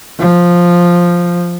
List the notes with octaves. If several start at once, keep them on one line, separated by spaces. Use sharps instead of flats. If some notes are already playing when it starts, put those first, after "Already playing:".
F3